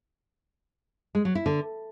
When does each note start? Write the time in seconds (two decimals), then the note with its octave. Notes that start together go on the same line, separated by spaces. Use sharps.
1.15 G#3
1.25 F#3
1.35 E4
1.46 D3